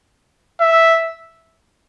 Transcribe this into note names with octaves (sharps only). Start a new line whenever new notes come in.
E5